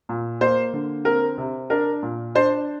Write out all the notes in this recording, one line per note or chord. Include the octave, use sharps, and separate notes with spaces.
A#2
A#3 C5
D3
C4 A#4
C3
D4 A#4
A#2
D4 C5